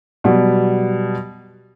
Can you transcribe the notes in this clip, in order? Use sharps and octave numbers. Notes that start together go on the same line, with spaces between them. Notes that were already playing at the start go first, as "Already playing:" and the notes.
B2 F#3 G3